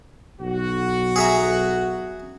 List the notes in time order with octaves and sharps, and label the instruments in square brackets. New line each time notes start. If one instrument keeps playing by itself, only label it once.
[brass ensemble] B1 F#4
[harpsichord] G#4 E5 A#5